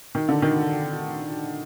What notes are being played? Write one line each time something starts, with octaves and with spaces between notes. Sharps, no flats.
D#3
D3
D#3